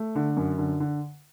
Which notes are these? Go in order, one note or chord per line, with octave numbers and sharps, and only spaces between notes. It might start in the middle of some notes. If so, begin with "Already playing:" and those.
Already playing: A3
D3
F#2
D3
D3